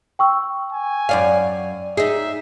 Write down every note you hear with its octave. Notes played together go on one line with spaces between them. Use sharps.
G5 C#6 E6
G#5
F#2 D5 F5
D#4 G#4 E5